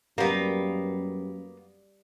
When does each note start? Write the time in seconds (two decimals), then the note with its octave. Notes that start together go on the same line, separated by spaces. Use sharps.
0.18 F#2 G3 A#3 B3